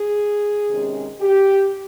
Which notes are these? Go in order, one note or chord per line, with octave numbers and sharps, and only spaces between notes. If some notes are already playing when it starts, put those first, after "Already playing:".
Already playing: G#4
C3 D#3 G#3 C#4
G4